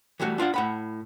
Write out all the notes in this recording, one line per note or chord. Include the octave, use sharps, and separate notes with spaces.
E3 G3 A3 F#4
D4 F4 D5 F#5
A2 F#5 B5